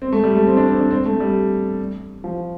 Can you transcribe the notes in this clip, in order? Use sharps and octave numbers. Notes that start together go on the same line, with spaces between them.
C4
A3
G3
A3
C4
D4
C4
D4
C4
A3
G3
F3